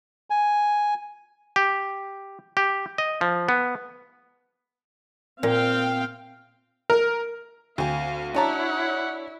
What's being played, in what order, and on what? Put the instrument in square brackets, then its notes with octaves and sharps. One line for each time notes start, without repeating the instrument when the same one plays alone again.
[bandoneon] G#5
[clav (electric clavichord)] G4
G4
D#5
F3
B3
[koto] A#2 [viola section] C4 F5 G5
[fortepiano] A#4
[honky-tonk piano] D2 [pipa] C4 G#5 [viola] F5
[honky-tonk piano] D4 C#5 D5 [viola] E4 [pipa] F#4 A5 A#5 [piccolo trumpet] F#5